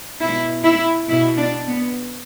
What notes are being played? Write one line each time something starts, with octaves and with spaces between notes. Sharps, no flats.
B2 E4
E4
B2 E4
D4
B3